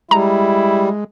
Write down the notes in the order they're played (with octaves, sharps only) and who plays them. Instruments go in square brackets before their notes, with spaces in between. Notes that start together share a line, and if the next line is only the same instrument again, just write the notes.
[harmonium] G3 [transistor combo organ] G#3 [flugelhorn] E4 [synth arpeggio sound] A#5